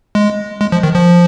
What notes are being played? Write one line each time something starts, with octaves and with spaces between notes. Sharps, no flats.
G#3
G#3
F3
D#3
F3